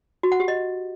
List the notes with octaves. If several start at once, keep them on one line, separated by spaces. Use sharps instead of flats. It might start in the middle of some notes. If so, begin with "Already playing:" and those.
F#4
F#5
G4
D#5